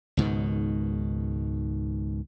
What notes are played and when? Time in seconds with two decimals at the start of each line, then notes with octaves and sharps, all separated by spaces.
0.17 C#2 G#2 B2 D#3